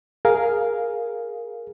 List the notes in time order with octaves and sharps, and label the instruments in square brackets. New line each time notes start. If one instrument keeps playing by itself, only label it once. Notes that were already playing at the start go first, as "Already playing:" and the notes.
[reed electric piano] G#4 A#4 F5